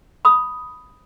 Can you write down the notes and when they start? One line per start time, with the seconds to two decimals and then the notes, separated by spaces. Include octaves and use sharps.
0.25 B5 D#6